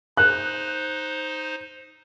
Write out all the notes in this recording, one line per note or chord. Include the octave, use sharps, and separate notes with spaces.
D#4 C5 F#6